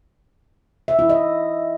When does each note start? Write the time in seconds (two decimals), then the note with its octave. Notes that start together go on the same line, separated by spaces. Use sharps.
0.88 E5
0.99 E4
1.09 D#5